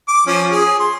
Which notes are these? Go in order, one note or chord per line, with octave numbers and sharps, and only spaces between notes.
D6
F3 C#4
G#4
C6